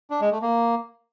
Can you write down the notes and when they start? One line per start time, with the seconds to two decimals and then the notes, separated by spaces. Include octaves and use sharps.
0.10 D4
0.21 G#3
0.31 A3
0.42 A#3